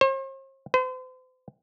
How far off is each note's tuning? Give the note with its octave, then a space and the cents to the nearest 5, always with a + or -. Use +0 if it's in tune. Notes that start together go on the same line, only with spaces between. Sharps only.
C5 +45
C5 -40